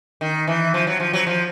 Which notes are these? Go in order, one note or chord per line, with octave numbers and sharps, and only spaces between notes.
D#3
E3
F3
F#3
F3
F#3
F3